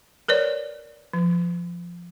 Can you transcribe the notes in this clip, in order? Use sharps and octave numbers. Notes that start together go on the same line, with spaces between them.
A#4 B4 C#5 D5
F3